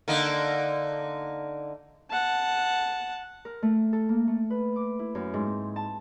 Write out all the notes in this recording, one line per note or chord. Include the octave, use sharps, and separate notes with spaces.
D3 A#3 D#4
F#5 A5
A#4
A3
A4
A#3
A3
B4
D6
E4
F#2
G#2
C4
A5